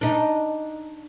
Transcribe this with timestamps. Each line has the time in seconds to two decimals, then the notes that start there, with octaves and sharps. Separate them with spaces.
0.01 D4 D#4